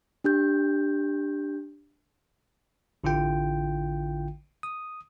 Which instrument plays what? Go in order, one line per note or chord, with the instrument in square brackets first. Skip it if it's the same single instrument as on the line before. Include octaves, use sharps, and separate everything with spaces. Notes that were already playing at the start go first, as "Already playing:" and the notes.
[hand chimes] D4 G4 G6
[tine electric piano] A1 D3 E4 F4 G5
D#6